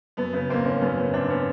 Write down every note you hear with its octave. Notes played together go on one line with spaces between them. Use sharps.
F#2 B3
C#3 B3
G#1 A#3 C4
G#1 B3 C#4
F#2 B3 C#4
C#3 B3 C#4
G#1 C4 D4
B3 C#4